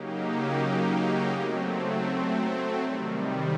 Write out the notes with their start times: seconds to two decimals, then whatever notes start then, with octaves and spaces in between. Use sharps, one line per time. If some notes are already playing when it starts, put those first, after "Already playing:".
Already playing: C#3 F#3 A#3 D#4 G4
1.31 F#3 A3 C4
2.80 C3 D#3 G3